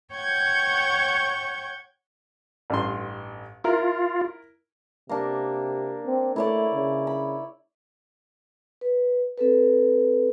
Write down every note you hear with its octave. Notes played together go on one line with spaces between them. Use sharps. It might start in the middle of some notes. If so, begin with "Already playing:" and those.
C#5 F#5 G5 C#6 G6 G#6
A1 G2 C6
E4 F4 A#4
C3 A#3 D4
C4
A3 E4 C#5 D5
C#3
B5
B4
C4 A4 B4